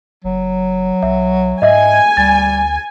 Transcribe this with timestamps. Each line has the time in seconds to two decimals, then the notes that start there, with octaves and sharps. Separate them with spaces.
0.24 F#1 F#3
1.03 B1 E5
1.62 G#2 D#5 E5 G#5
2.17 D2 G3 A6